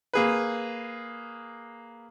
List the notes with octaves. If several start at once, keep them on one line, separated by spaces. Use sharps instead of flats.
A#3 G#4 B4